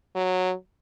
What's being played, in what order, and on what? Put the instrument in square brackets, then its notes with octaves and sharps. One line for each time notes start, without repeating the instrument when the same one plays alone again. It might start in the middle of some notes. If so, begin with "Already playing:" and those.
[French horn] F#3